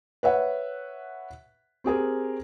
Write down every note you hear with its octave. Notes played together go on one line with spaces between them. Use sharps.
B4 C#5 E5 F#5
C4 G4 G#4 A#4